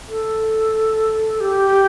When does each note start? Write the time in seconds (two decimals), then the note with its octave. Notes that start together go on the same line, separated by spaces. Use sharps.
0.09 A4
1.40 G4